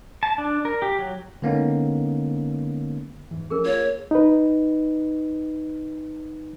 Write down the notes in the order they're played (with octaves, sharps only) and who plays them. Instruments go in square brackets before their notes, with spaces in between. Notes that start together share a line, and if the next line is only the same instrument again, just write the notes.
[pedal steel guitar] A5
D4
A#4
G4
F#3
[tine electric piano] D3 G#3 A#3 B3 C#4 D#4
[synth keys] E2 G#2 E3
[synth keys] F3 A3 C#4 [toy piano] G#4 A#4
[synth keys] A#3 F4 [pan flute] C#5
[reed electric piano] D#4 B4